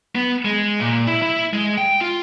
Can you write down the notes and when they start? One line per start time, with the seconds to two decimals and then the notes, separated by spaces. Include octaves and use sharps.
0.15 B3
0.45 G#3
0.80 A#2
1.07 E4
1.22 E4
1.53 G#3
1.77 G5
2.01 F4